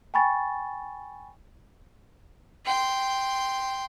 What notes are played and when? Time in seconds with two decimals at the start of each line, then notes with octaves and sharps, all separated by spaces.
0.14 G5 G#5 B5 C#6 A6
2.66 G5 C6